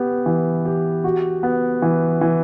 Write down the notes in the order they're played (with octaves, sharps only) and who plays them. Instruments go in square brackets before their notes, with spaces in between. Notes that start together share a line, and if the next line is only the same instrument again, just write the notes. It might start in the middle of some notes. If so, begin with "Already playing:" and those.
Already playing: [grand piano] B3 G4
E3
G4
F#4
B3
E3
E3